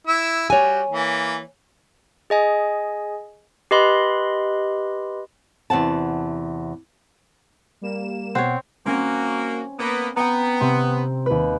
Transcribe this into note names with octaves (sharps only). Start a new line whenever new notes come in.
E4 E6
G3 F#4 C#5 G#5
E3 A#3
G#4 D#5 G#5
G4 B4 D#5 B5 C6
E2 C3 F#5 A5
G3 A#3 E7
B2 C4 C#5 F#5
A#3 C4 C#4 F#4
A#3 B3 B4 D#7
B3 G5 A#5
C3 C4
D#2 B4